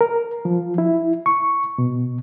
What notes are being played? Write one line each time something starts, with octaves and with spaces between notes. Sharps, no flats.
A#4
F3
E4
C#6
B2